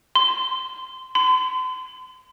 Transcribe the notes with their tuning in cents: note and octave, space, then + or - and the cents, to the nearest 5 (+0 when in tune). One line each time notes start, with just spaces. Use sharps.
C6 -15
C6 -40